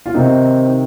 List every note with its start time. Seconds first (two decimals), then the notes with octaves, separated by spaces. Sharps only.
0.06 F4
0.14 C3 D#3 C4 D#4